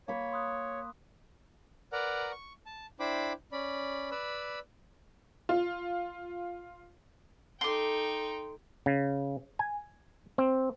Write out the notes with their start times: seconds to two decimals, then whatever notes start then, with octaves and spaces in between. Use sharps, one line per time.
0.08 A#3 C#5 B5
0.32 C6 D#6 F#6
1.92 A#4 B4 D5 F#5 A#5
2.32 C#6
2.66 A5
3.00 D4 E4 C5 G5 B5 D6
3.52 C#4 D5 B5
4.11 B4 D5 B5 E6
5.49 F4
7.61 D#4 A4 G5 C6 D6
8.86 C#3
9.59 G#5
10.38 C4